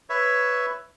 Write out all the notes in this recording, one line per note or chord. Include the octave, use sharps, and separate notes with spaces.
B4 C#5 E5